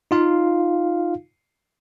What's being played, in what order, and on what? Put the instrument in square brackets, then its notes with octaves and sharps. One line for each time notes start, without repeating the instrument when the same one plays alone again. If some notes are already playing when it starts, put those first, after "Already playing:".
[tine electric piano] D#4 F4 F5